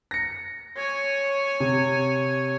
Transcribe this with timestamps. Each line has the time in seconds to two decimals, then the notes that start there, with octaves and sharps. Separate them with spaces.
0.11 A#6 C#7
0.77 C#5 G#5
1.60 C3